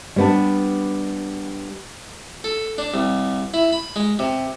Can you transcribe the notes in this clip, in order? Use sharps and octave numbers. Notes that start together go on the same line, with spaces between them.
G3 B3 D4
A4
D4
C2
E4
B5
G#3
C3